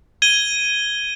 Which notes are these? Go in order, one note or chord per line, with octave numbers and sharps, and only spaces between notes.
G#6 D#7 G7